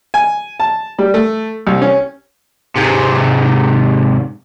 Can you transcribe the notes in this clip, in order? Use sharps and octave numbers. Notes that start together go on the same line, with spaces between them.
G#5
A5
G3
A3
C2
C#4
G#2 C3